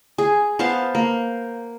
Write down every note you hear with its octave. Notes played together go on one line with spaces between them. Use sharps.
G#4
B3 C5 F5 A5
A#3